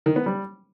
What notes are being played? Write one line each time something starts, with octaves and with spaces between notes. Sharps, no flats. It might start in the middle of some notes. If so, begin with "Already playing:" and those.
D#3
B3
G3